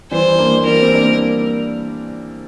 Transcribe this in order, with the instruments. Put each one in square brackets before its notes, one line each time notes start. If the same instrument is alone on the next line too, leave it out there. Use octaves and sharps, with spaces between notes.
[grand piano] E3 G3 [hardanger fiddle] C5
[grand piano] A#3 D4
[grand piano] E3 G3 [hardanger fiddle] A#4
[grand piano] C4
A#3 D4